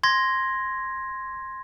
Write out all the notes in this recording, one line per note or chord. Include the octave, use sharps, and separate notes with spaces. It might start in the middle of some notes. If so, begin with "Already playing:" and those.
C6 G#6 A#6